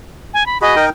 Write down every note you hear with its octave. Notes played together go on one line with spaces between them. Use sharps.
G#5
B5
F#4 G#4 D#5 B5
D#4 A#4 G5